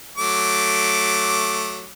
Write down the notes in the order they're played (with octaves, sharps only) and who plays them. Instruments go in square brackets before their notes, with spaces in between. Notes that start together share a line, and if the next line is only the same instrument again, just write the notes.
[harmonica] F#3 A3 D6